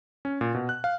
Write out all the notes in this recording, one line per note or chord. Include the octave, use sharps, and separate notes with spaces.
C#4
A#2
B2
F#6
F5